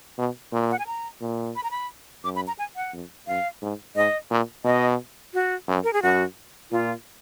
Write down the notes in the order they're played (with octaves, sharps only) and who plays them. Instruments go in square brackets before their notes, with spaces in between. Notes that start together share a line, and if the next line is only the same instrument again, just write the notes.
[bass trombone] B2
A#2
[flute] F#5
G#5
A#5
[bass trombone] A#2
[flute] B5
A#5
B5
[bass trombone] F#2 [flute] D6
[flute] B5
A#5
G#5
F#5
[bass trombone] F2
[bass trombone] F#2 [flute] F5
[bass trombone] G#2
[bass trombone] G#2 [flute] D#5
[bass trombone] A#2
[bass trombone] B2 [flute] D#5
[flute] F#4
[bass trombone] F#2
[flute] A#4
G#4
[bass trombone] F#2 [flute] F#4
[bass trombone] A#2 [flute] F4